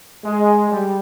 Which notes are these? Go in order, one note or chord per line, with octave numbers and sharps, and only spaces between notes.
G#3
G3